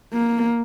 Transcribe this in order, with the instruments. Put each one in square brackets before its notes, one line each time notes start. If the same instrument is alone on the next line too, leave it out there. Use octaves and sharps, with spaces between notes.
[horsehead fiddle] A#3